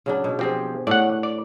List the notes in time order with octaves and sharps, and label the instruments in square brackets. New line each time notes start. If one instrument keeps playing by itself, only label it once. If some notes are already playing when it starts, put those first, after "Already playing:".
[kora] C#3 F#3 D4
B2 F#3
[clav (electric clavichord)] F3 C4 [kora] G4 G#4
[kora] A2 A3 [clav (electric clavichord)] D5 F#5
[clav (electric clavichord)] D5